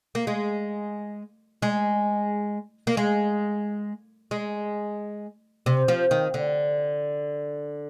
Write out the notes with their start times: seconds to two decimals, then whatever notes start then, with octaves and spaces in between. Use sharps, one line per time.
0.15 A#3
0.27 G#3
1.62 G#3
2.87 A#3
2.97 G#3
4.31 G#3
5.66 C3
5.88 F3
6.11 D#3
6.34 D3